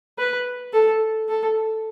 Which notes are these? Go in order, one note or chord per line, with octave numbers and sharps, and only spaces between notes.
B4
A4
A4